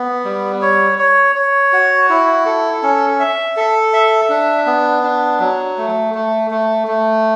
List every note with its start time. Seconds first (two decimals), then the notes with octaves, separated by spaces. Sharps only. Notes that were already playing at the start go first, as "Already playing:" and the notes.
Already playing: B3
0.25 G3
0.62 C#5
0.99 C#5
1.35 C#5
1.73 F#4
2.10 E4
2.46 A4
2.83 C#4
3.20 E5
3.57 A4
3.93 E5
4.29 D4
4.66 B3
5.03 D4
5.40 F#3
5.78 A3
6.14 A3
6.51 A3
6.88 A3